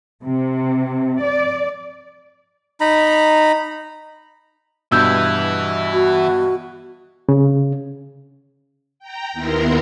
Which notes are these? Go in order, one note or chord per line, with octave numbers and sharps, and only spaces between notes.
C3
D5
D#4 A#5 B5
G2 B2 E3 E4 E6 G6
F#4
C#3
G5 A#5
D#2 B3 E4 A#4 A#5 C6